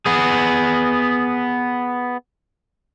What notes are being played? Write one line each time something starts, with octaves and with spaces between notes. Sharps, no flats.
B3 G#4